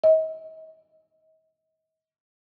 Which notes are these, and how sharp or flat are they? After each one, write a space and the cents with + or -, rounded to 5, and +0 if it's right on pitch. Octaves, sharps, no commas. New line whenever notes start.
D#5 +40